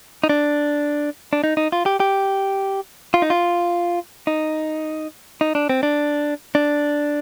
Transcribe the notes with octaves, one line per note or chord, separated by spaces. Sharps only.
D#4
D4
D4
D#4
D#4
F4
G4
G4
F4
D#4
F4
D#4
D#4
D4
C4
D4
D4